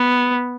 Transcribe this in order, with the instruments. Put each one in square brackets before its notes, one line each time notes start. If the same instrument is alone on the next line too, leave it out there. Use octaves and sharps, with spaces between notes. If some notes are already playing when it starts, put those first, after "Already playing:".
Already playing: [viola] B3